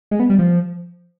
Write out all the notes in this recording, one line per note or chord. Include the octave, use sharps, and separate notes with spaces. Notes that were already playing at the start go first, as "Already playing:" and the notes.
G#3
B3
G3
F3